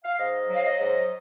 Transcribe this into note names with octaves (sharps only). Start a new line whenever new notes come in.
F5
G#2 D#5
F#3
F5
D#5
G#2